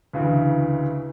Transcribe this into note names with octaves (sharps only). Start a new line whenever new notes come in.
D2 C#3 E3